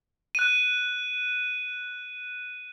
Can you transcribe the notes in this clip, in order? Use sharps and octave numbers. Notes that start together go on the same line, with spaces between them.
F#6 D#7